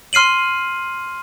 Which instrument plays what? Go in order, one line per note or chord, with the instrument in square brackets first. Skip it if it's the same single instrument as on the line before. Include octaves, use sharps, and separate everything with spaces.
[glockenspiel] C6 F6 C7 D#7 F#7